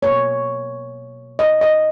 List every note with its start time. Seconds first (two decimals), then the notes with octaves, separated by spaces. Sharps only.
0.02 B2 A#3 C#5
1.39 D#5
1.61 D#5